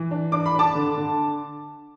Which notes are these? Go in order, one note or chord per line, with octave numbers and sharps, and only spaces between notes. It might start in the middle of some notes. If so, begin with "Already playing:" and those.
Already playing: E3
D4
D4 D6
B5
D4 A5 D6
D3
D3